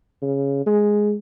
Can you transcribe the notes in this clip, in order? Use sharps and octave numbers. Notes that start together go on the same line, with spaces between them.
C#3
G#3